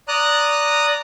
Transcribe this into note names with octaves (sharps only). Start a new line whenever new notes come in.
D5 A#5 D#6 F#6